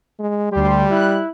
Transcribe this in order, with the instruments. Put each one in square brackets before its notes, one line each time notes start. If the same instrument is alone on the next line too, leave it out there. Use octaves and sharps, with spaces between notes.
[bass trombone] G#3
[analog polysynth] D2 C6 [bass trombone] G3 [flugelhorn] G4
[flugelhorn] E4 [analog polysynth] F#6